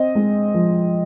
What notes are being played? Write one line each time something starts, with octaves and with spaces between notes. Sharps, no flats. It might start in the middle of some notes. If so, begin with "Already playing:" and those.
Already playing: C4 D#5
G#3
F3